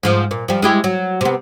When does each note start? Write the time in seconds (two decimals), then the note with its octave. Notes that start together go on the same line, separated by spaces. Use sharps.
0.03 G#2 F3 F4
0.31 A#2
0.48 F3 G3
0.62 G#3 E4 G4
0.84 F#3
1.21 C3 B3